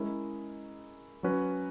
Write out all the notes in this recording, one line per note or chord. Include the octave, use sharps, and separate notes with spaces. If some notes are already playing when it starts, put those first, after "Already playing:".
Already playing: G#3 C#4 E4 A#4
F#3 C#4 F#4 B4